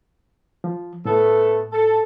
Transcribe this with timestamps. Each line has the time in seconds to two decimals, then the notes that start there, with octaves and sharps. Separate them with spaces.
0.64 F3
1.05 A2 A3 B3 A4
1.72 A4